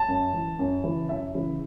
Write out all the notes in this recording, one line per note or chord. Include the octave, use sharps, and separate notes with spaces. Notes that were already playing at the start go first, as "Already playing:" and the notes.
Already playing: A5
F#2
E3
F#2
C#3 E3
F#2 E5
C#3 E3